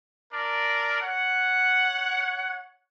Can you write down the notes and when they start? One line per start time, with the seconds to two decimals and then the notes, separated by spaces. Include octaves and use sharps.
0.33 D4 A#4 D5
1.02 C#5 F#5